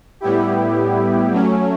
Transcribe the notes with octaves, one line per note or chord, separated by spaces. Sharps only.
A2 G3 B3 E4 G4
F#3 A3 C#4